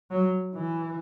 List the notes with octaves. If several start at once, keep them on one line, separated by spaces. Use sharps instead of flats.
F#3
E3